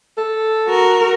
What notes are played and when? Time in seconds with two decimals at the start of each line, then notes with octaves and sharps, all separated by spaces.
0.18 A4
0.68 F#4 A#4